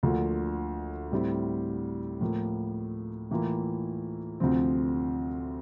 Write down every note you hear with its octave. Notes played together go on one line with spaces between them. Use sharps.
D2 D3 F3 A#3 F4
A2 G3 C4 E4
A2 F3 A#3
A2 E3 A#3 F4
D2 C3 F3 C4